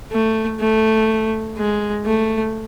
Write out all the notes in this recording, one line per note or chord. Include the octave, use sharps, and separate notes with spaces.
A3
A3
G#3
A3